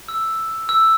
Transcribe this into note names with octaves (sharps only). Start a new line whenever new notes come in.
E6
E6